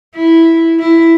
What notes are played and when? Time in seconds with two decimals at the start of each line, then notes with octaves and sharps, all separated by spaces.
0.15 E4
0.80 E4